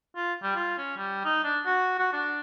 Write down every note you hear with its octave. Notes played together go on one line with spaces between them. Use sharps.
F4
G3
F4
C#4
G3
D#4
D4
F#4
F#4
D4